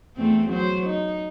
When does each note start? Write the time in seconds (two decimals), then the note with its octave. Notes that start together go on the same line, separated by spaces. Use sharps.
0.16 E2 A3 C4
0.48 F#3 C5
0.86 D#4